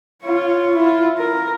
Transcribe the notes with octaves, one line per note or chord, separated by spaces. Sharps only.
F4 C#5
E4 F4
A#4